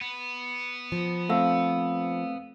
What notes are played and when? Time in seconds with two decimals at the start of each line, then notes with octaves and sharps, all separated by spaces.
0.01 B3
0.92 F3
1.29 A3 C4 F5 F#5 E6